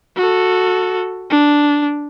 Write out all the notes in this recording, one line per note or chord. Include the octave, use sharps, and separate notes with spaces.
F#4 A4
D4